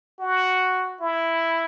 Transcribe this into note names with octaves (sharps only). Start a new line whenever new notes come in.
F#4
E4